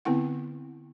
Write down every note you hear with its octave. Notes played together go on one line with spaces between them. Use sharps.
D3 B3 C4 E4 F#5